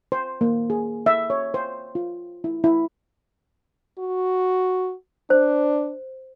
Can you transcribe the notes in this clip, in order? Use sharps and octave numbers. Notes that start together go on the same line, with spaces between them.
C5
A#3
G#4
E5
C#5
C5
F4
E4
E4
F#4
D4 C5